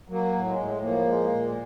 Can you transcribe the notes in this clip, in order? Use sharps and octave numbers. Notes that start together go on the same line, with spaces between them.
F#3 A#3
A2
G#3
A2
F3 A#3
G#3
A#2